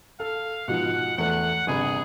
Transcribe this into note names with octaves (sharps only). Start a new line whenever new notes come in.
A4 F5
G#2 B2 F3 F#5
E2 A3 F#5
G1 C3 G#4 B5